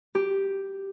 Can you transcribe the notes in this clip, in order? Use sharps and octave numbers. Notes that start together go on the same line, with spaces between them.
G4